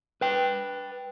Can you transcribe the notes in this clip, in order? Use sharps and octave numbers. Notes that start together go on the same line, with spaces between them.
B4 G5